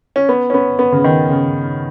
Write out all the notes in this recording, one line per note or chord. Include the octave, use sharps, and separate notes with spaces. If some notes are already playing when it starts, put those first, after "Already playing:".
C#4
B3
C#4
B3
B3
C#3
D#3
C#3